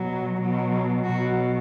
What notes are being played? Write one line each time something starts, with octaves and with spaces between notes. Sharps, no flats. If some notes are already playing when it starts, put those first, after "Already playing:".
Already playing: B2 F#3
B2 F#3
B2 F#3 F#4